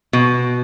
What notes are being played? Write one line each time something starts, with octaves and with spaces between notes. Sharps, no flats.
B2